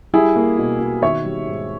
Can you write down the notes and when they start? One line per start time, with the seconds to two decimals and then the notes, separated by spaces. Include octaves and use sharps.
0.13 G3 E4 G#4
0.36 A#3
0.58 B2
0.80 B2
1.02 D#3 C#5 E5
1.25 G3
1.47 G#2